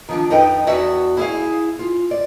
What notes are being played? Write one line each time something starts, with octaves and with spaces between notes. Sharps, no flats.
D#3 F3 D4
F2 D#4 A4 B4 G5
E2 F#4 D5 E5
E4 G#4 F5
F4
D5